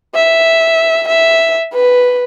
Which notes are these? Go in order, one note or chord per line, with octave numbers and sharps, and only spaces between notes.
E5
E5
B4